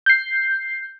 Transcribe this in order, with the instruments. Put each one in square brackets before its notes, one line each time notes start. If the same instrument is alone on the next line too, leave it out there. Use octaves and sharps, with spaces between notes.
[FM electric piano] G6 C7